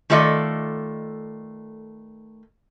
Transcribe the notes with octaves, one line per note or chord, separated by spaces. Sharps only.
D#3 A3 F4 A4 D5 D#5